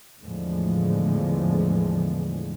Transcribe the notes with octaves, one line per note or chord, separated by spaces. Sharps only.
E2 A2 D3 F3 G#3